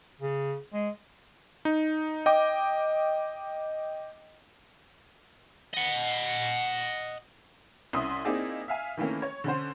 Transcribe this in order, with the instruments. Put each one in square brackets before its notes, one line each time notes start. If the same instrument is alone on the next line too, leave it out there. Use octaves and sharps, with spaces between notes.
[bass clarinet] C#3
G#3
[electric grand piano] D#4
D#5 G5 D6
[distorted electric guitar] D#5 F#5
[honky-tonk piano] C2 C#4 E5 C6 D#6
A#3 C4 D#4 E4 G#4 D5
E5 F5 G#5
D#3 E3 A3 A#3 C#4
C#5
D3 C#4 C5